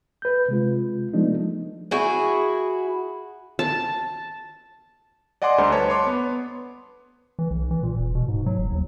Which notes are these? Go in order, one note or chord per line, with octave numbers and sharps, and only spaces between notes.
B4 G6
C3 G#3 F4
F3 G#3 A3 B3 D4 D#4
E4 F#4 G#4
A5
D5 D#5 F#5 G#5 C6 D6
D2 D3 G3 C5 A#5 C6
B4 C#5 A5
C#5 C6 D6
B3
E3
B1
E3
A#2
D#1
B2
G#2
F#3
F#1
D#2